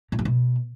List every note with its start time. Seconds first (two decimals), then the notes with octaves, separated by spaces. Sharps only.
0.12 A#2
0.19 G2
0.25 B2